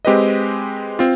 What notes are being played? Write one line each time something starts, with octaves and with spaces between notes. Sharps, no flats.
G#3 C4 G4 B4 D#5
C4 F4